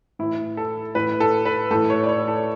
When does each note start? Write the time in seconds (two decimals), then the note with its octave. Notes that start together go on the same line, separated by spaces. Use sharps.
0.19 A2 E3 E4
0.57 A4
0.95 A2 E3 B4
1.20 A4
1.46 B4
1.71 A2 E3 A4
1.90 C#5
2.04 D5
2.09 C#5
2.28 A4